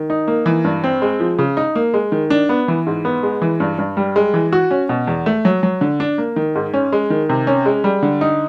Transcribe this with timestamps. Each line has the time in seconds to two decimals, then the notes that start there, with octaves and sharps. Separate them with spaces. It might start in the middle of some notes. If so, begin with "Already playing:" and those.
Already playing: D#3
0.10 D#4
0.28 A#3
0.46 E3
0.64 G2
0.84 C4
1.02 G#3
1.20 F3
1.39 C#3
1.57 D#4
1.75 A#3
1.94 G#3
2.12 D#3
2.30 D4
2.49 B3
2.68 E3
2.87 G#2
3.05 B3
3.23 G#3
3.42 E3
3.60 G2
3.78 G2
3.97 G3
4.16 G#3
4.34 E3
4.53 F#4
4.71 C#4
4.89 B2
5.07 E2
5.26 A3
5.45 F#3
5.63 F#3
5.81 D3
6.00 D4
6.18 A#3
6.36 D#3
6.55 G#2
6.74 C#4
6.92 G#3
7.10 D#3
7.29 C3
7.47 C#4
7.66 G#3
7.84 G3
8.03 D3
8.21 D#4